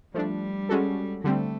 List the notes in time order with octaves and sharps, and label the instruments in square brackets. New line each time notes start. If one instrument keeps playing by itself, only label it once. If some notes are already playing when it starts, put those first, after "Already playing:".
[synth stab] F3 A3 D4 [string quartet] G3
[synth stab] G#3 C#4 F#4 A4
[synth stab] D3 G3 C4 [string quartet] A3